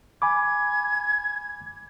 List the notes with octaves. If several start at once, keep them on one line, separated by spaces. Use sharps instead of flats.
G#5 B5 D6 G#6